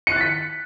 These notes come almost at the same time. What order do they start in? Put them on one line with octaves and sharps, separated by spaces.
C#7 F#6 A6 B6